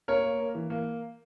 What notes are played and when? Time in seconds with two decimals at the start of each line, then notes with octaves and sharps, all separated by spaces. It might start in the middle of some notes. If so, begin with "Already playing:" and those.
0.08 A#3 A#4 C#5
0.24 A#3
0.40 A#3
0.55 E3
0.70 A#3